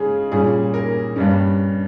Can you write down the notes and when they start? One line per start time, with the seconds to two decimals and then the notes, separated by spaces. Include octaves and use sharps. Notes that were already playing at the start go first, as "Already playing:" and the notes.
Already playing: C#3 G#3 C#4 G#4
0.32 A#2 G3 C#4 G#4
0.74 A#4
1.16 G2 G3 C#4